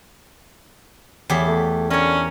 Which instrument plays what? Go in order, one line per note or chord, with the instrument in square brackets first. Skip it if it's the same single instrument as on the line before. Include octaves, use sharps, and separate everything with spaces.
[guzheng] E2 G4 B5 [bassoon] A2
[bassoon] A3
[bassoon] D3 [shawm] C#4 [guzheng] A#4 C#5